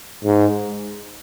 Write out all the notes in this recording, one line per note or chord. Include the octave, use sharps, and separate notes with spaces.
G#2